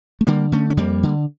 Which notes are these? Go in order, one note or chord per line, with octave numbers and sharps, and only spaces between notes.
A3
D3 G3 A#3
D3 A3 C#4
C#4
F2 G3 A#3
D3